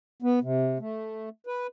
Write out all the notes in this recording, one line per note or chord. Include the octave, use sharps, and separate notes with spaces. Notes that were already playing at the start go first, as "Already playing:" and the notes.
B3
C3
A3
B4